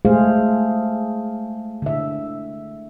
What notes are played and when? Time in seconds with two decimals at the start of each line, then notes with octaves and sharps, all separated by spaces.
0.05 G#3 A3 G#4 C5 F5
1.82 D3 E5